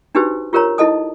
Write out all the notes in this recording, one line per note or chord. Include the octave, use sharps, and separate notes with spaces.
D4 D#4 F#4 G4 B4 C5
F4 G4 A#4 C5 C#5 A#5
D#4 E4 A4 D#5 A5 D#6